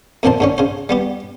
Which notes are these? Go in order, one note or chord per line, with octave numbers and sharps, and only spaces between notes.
F2 A#2 D3 C4 C5 A5
G#2 D3 C#4
C#3 C5
G3 B3 G4